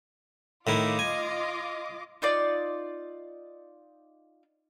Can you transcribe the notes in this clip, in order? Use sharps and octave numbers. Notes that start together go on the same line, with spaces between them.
A2 D#3 E4 F4 D#5 D6
G#5
D#4 F4 D5